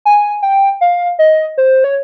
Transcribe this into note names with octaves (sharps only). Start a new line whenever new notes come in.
G#5
G5
F5
D#5
C5
C#5